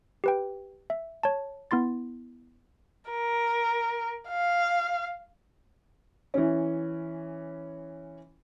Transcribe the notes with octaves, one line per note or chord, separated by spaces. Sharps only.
G4 B4 G5
E5
C#5 A5
B3 E4 C6 A6
A#4
F5
E3 C#4